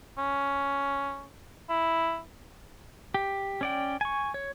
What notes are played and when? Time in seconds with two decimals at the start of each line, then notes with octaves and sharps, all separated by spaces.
0.18 C#4
1.70 E4
3.14 G4
3.61 C#4 D5 G5
4.01 G#5 C#6
4.34 C#5